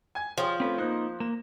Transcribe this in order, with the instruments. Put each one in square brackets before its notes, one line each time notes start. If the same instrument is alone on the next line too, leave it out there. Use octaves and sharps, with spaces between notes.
[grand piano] G#5 G#6
[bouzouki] F3 [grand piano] G#4 C#5 G5
[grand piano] A3 C#4 [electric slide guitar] C4 B4
[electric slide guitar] A#3 D#4 [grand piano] C5 F#6
[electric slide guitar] A#3 [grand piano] E7